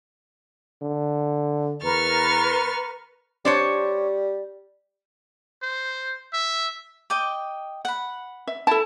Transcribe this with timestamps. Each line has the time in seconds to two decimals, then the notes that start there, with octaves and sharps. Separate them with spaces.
0.82 D3
1.83 E2 A#4 B4 C#6 F6 A6
3.45 G3 D4 C5 C#5
5.62 C5
6.33 E5
7.10 D#5 G5 D6
7.85 F#5 B5
8.47 E5
8.67 E4 A4 A5